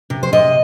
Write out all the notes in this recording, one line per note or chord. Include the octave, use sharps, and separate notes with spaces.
C3
C5
C3 D#5